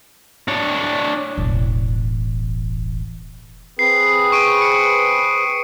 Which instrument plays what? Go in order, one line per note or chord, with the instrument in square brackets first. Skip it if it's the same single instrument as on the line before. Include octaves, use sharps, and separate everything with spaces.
[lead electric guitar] D4 C#5
[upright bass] E1 A1
[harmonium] C4 G#4 B4 [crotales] C7
[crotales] C#6 D7 D#7
C#7